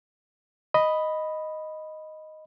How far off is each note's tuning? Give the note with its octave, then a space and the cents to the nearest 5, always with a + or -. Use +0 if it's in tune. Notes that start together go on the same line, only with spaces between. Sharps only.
D#5 +0 B5 +0